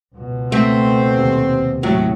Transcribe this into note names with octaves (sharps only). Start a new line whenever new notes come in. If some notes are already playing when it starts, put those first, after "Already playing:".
C#2 B2
A3 C4
D#2 C3
A2 F#3